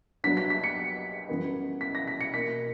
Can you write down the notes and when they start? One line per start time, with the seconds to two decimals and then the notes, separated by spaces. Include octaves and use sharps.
0.24 G2 F#3 B3 D4 B6
0.37 B6
0.50 B6
0.64 C#7
1.29 F#2 E3 G3 B3
1.81 B6
1.95 A#6
2.08 B6
2.21 C#7
2.34 B2 A#3 E4 B6